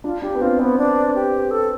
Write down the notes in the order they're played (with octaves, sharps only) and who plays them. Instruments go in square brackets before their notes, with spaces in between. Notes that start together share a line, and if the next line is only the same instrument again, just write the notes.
[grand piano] D4 [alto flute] F4
[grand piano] D4 [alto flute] G4
[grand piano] B3
[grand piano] C4 [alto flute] F4
[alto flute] B3 [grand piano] C4
[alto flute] D4
G4
A4